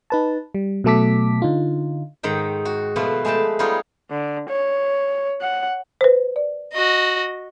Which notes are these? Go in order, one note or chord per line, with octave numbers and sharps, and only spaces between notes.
D#4 B4 A5
G3
B2 F#3 A3 A4 D6 B6
D3 D#4 F4
G#2 D#3 G5
F#4
B2 F3 A3 F4 B4
G#3 A3 B4 G5 A5
G3 B3 D#4 F4 C#5
D3
C#5
F#5
B4 C5
D5
F#4 D#5